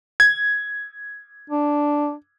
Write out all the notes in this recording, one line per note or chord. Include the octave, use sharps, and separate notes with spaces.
G#6
D4